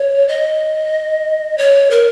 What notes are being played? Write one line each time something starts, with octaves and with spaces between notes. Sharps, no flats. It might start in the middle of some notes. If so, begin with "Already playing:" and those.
Already playing: C#5
D#5
C#5
A#4